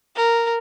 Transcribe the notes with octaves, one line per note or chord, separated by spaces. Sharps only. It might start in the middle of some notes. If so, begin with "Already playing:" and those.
A#4